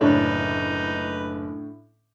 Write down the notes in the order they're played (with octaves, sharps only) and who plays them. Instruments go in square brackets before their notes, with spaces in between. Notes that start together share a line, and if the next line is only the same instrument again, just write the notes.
[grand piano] F#1 D4 C#5 [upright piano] A2 D3 [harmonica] D#4 B4